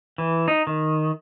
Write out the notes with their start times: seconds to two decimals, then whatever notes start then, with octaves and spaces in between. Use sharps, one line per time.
0.18 E3
0.48 D#4
0.67 D#3